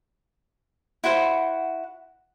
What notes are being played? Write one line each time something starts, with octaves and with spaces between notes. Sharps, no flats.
E4 F#4 C5 F#5